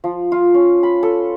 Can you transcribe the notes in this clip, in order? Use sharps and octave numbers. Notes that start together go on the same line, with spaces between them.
F3
F4
C#4
B5
A4